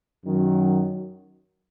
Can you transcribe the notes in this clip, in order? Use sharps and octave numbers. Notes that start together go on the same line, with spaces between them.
F#2 D#3 F#3